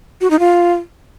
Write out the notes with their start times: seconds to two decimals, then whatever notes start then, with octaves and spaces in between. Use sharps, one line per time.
0.21 F#4
0.30 D#4
0.39 F4